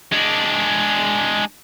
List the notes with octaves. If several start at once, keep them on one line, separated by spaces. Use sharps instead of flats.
G#3 D4